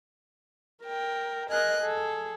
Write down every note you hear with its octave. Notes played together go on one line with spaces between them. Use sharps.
A#4 G5
G#4 A#4 D#5 F#6
G#4 A4